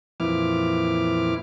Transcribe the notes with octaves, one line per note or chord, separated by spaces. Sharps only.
F2 A#2 E3 E4 D6 F6